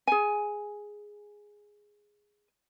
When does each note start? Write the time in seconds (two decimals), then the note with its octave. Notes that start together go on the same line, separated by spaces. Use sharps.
0.07 G#4 G#5